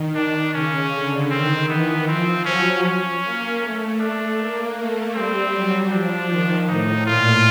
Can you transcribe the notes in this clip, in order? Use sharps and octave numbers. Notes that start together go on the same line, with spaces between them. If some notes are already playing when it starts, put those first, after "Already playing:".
Already playing: D#3
D#3 D4
C#3 C#4
D3
D#3 C4
E3 B3
F3 C4
F#3 C#4
C#4
A#3
A3
A3 D4
A#3
A3
G3 C4
F#3
F3 D4
D#3
A2 D#4
A#2 F4